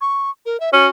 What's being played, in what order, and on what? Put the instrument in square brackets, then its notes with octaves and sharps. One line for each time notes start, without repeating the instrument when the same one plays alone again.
[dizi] C#6
A#4
E5
[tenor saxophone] C#4 [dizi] F#4